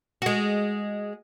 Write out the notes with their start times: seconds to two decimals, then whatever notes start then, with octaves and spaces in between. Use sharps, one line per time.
0.22 G#3 F#4